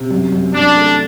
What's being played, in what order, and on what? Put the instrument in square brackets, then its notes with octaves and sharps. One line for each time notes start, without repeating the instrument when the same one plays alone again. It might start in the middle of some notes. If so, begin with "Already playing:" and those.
Already playing: [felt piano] C3
F#2
F#2
[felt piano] F#2 [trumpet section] D4
[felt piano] A3